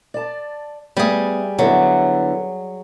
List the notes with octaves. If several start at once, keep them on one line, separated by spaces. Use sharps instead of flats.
D5 A5
G3 A3 B3 G#4
D3 F#3 B3 E4